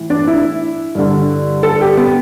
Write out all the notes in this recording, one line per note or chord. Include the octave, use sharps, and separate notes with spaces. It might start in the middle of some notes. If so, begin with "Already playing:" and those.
Already playing: A2 E3
D4
E4
G2 D3
A4
G4
B3